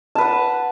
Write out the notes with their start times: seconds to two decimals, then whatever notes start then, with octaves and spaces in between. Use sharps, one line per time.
0.15 A5
0.18 B4
0.21 F#5